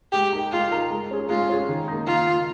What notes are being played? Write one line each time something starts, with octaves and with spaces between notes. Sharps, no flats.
G#3 G4
D#4 A#4
G#3 F4
D#4 A#4
G#3
C#4 G#4
G#3 F4
C#4 G#4
D#3
A#3 D#4
D#3 F4
A#3 D#4